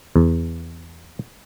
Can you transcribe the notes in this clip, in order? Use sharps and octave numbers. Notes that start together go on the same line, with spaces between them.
E2